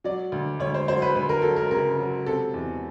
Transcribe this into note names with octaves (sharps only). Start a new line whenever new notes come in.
F#3 D5
D2
D2 C#5
C5
F#3 C5
B4
D2 B4
A#4
F#3 A4
A#4
C#3 A#4
F#3
C3 A4
E2